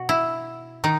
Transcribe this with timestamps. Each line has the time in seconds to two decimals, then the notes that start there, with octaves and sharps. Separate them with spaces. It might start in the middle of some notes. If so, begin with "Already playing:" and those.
Already playing: B2 F#4
0.09 E4
0.84 D#3 D#4